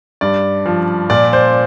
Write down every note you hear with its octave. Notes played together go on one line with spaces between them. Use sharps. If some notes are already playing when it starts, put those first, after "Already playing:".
G2 D5
F3
A#2 D5
C5